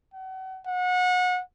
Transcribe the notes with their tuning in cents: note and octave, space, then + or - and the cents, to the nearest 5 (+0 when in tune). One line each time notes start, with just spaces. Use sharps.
F#5 +35
F#5 -30